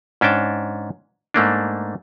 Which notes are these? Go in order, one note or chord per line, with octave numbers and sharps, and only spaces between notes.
G#2 C#4 D4 G5 A5
G#2 A3 A#3 D4